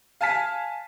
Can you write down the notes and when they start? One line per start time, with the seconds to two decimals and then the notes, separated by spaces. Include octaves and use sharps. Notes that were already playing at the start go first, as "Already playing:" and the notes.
0.21 F5 G#5 A5 F6 B6